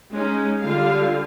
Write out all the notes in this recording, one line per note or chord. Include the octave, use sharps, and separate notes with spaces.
G#3 C#4 D#4
D3 G3 F4 F5